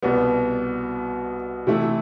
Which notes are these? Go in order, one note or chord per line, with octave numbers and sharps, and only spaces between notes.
C2 B2 G3 B3
C3 E3 A3 E4